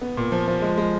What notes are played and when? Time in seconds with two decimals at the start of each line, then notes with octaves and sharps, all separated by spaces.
0.01 B3
0.17 A#2
0.32 F3
0.47 F3
0.62 G#3
0.78 G#3